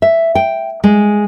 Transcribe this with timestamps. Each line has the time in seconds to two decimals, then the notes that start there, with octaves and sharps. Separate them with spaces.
0.02 E5
0.35 G5
0.84 G#3